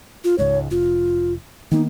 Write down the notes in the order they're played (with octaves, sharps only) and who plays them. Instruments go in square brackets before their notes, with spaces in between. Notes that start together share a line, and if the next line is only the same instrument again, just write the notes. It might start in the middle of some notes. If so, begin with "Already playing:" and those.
[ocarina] F4
[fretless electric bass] C#2 G#2 [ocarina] C#5
[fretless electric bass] F1 [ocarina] F4
[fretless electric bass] D#3 A#3 B3 [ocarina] D#4